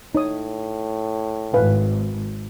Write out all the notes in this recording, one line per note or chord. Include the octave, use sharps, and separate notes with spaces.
A2 D#4 C#5 D#6
G#1 B4 F5 G#5